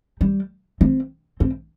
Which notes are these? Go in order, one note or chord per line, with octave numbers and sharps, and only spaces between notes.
G3
C4
C4